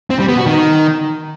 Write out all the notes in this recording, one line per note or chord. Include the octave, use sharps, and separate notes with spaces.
C4
G3
B3
F#4
D#3